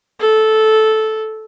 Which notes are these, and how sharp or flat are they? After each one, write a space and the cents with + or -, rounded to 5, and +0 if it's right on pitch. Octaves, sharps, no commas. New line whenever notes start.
A4 -10